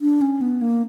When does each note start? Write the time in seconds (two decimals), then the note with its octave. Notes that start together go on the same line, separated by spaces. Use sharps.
0.01 D4
0.21 C#4
0.41 B3
0.61 A#3